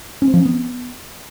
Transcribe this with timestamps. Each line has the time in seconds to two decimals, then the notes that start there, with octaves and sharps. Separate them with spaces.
0.22 C#4
0.28 C4
0.34 F3
0.40 C#4
0.45 B3